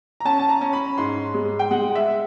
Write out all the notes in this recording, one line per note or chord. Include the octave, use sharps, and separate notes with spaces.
A#5
C#4 A5
A5
A#5
C#4
B5
G#2 C6
G#3
G5
G#3 F#5
E5